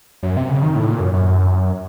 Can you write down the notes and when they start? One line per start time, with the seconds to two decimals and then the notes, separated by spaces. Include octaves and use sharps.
0.23 F#2
0.37 C3
0.49 C#3
0.63 D#3
0.75 A2
0.88 A#2
1.00 F#2
1.13 F#2